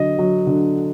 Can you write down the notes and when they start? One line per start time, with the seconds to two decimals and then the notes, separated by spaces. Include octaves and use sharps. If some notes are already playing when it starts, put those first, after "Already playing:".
Already playing: D3 F#3 D#5
0.19 F#3
0.47 D3